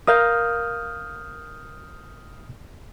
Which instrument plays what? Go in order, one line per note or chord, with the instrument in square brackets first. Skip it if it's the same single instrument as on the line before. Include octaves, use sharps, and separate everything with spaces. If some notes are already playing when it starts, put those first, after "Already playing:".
[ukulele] A#4 F5 [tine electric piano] D#6 F6 G6